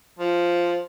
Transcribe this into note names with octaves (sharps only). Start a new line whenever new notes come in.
F3